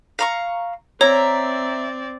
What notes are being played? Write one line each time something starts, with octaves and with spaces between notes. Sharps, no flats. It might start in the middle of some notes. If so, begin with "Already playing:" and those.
F5 A#5 C#6
C4 C#5 D5 E5 A#5